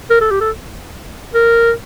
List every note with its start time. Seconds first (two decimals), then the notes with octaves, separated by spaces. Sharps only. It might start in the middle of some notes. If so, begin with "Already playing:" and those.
0.10 A#4
0.21 A4
0.31 G4
0.41 A4
1.34 A#4